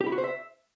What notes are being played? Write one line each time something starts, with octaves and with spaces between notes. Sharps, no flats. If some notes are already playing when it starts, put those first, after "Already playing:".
G4
E4
F#4
C5
E5